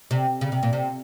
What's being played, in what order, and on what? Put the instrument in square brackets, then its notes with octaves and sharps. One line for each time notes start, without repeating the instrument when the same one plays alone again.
[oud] C3
C#3
C3
A#2
C3